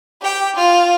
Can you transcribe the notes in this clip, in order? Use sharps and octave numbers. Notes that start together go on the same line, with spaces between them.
G4 G5
F4